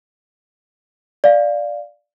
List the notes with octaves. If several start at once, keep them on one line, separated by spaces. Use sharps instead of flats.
D5 F5